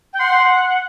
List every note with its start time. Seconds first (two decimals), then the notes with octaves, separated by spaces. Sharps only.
0.13 G5
0.20 F#5 C6